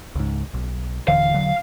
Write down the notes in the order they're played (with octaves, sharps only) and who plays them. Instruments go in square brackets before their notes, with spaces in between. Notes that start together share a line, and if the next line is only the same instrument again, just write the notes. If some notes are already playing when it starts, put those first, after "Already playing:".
[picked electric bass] C#2 G#2
B1
[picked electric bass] D#1 D3 E3 [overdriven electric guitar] F5
[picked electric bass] E1 D3 F#3